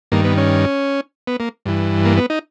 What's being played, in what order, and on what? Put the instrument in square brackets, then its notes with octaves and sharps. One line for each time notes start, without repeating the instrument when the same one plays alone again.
[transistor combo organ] G2 D#3 A#3
B3
C#4
B3
A#3
G2 E3
A#3
B3
D#4